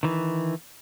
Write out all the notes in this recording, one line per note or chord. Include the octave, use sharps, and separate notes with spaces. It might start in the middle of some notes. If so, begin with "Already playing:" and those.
D#3 E3